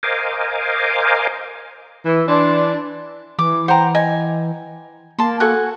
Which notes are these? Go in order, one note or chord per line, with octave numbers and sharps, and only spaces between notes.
A#4 C5 D#5 F5 G#5 D6
E3
E3 D4 D5 A5 C6
E3 D6
C5 F#5 G5 A#5
D#5 G#5
A#3 A5 C6
F#4 A4 G#5 C#6 F#6